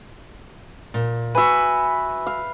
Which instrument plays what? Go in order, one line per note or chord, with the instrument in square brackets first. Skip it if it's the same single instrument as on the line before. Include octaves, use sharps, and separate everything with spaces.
[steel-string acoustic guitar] A#2
[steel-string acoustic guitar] F#4 G#5 [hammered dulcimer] B4 E5
[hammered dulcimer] F5